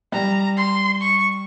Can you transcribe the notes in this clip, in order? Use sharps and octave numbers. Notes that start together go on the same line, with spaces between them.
G3 A#5
C6
C#6